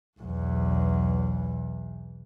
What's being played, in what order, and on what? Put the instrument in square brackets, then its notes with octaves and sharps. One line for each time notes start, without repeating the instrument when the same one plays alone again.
[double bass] B1 E2